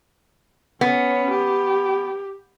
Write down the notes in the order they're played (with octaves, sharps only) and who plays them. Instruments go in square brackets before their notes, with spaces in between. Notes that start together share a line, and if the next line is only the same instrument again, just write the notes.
[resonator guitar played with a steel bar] B3 [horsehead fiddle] C#4 C#5
[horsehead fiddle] G4